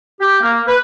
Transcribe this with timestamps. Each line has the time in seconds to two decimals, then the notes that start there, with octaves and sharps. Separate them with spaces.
0.20 G4
0.41 A#3
0.67 B4